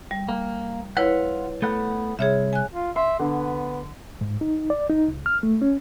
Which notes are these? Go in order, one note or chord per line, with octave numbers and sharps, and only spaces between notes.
G3
A#3
E4 F4 B4 C#5 F#5
A3 B3 F#5
C2 G#4 C#5 E5
G#5 F#6
F4
E5 C6
D3 B3
G#2
D#4
D5
D#4
C#2
F6
A3
C#4